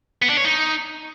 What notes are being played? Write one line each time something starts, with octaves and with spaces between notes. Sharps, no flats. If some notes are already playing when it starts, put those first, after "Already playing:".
B3
D4
C#5
D#4